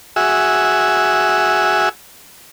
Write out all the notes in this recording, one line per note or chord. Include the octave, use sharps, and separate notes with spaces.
F#4 G#4 E5